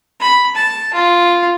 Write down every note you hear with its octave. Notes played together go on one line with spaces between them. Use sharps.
B5
A5
F4